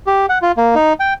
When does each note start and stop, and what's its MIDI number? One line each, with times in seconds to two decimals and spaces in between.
0.07 0.26 67
0.29 0.38 78
0.42 0.52 65
0.57 0.75 58
0.75 0.93 63
1.00 1.14 79